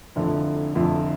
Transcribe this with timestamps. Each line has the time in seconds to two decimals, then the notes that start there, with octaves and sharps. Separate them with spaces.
0.16 F1 F2 D3 F3 E4
0.75 F1 F2 D3 F3 E4